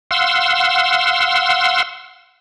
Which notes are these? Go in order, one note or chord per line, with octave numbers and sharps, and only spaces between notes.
F5 F#5 C6 E6